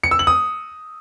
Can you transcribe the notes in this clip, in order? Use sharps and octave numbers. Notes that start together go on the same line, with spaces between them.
C#7
E6
F#7
D#6